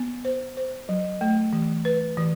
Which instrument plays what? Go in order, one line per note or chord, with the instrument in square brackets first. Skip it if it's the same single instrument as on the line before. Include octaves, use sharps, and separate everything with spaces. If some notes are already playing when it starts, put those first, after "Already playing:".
Already playing: [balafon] B3
C5
C5
F#3
A3
E3
B4
E3